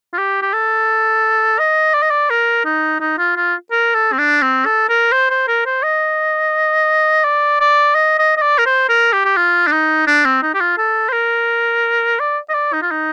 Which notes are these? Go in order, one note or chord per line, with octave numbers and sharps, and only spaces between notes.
F4
G4
G4
A4
D#5
D5
D#5
D5
A#4
D#4
D#4
F4
F4
A#4
A4
C4
D4
C4
A4
A#4
C5
C5
A#4
C5
D#5
D5
D5
D#5
D#5
D#5
D5
A#4
C5
A#4
G4
G4
F4
D4
D#4
D4
C4
D#4
G4
F4
A4
C5
A#4
D5
D#5
D5
D#4
F4
D#4